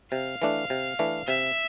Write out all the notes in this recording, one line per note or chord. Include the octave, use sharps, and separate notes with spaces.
C3 F5
E3 A3 D4
C3
E3 A3 D4
C3 E5